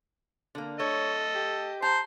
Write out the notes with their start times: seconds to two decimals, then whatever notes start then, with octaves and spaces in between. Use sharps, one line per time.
0.55 D3 A#3
0.80 A3 A4 C#5 D#5
1.35 G4
1.82 C5 A5 A#5